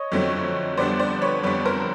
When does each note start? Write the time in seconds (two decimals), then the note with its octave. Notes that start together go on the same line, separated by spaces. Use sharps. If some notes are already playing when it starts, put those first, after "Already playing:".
Already playing: C#5 D#5
0.12 F2 D3 F#3 A3 C4
0.77 F2 D3 G3 B3 D4 C5 D5
1.00 C5 D5
1.22 B4 C#5
1.43 F2 D3 G3 B3 D4 B4 C#5
1.65 A#4 C5